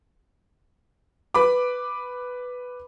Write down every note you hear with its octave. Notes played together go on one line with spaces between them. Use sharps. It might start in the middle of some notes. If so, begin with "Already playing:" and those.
B4 B5 D6